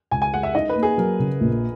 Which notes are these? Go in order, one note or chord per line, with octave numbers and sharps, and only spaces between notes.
C#2 G#5
G#5
G#3 F#5
E5
D#4 D#5
B4
A#3
G#4
F#3 A#4
C#3
A#1